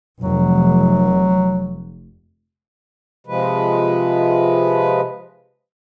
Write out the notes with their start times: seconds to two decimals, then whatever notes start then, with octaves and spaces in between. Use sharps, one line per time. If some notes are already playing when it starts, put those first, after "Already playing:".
0.22 F1 F#3
3.27 C3 F3 G#3 B4